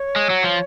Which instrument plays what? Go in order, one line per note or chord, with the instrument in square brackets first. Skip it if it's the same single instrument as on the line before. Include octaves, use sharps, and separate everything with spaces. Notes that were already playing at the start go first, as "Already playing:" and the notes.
Already playing: [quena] C#5
[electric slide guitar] G#3
F#3
F3